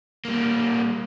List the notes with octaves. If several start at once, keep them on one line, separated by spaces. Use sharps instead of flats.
G3 A#3